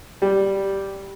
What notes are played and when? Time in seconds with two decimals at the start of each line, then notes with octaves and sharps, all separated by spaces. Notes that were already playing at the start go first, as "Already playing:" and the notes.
0.22 G3